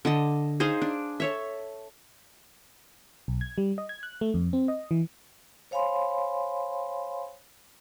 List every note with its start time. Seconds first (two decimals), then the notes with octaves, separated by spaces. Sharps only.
0.05 D3 D#5 A5
0.60 D#4 G#4 C5 F5
0.82 D4
1.20 A4 C#5 E5
3.28 B1
3.41 G#6
3.58 G3
3.78 D#5
3.89 G#6
4.03 F#6
4.21 A3
4.34 F2
4.53 C4
4.68 D#5
4.91 E3
5.71 C5 C#5 F5 G#5 B5 C6